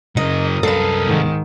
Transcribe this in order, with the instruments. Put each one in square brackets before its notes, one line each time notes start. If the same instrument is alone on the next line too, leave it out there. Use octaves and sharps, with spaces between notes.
[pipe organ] F#2 A#4 D#6 [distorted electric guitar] C#3 F#3 [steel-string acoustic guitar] D#5
[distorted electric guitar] C2 F5 [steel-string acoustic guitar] A4 B4
[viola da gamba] G#2 D#3